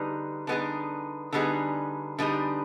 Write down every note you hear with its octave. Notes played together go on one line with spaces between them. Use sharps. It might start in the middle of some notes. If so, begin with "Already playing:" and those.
Already playing: D3 G3 B3 D#4 G#4
D3 G3 B3 D#4 G#4
D3 G3 B3 D#4 G#4
D3 G3 B3 D#4 G#4